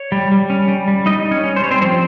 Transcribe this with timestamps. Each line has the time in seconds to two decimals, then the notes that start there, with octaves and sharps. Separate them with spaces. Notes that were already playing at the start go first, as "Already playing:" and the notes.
Already playing: C#5
0.12 G3
0.32 G3
0.50 C#4
0.68 G3
0.88 G3
1.06 G3 D#4 D#5
1.25 G3
1.31 C#4 C#5
1.44 C#4
1.56 C5
1.62 G3 C#5
1.71 C4 C5
1.81 F3 C4 C5